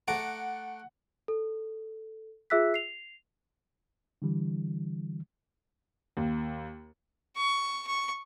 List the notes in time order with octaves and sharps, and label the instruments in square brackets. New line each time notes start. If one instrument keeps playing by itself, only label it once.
[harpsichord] A3 A#5 D6 [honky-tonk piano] F#5
[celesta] A4
F4 G#4 E5 E6 F#6 B6
C7 F7
[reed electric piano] D3 E3 G3
[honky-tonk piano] D#2
[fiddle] C#6
C#6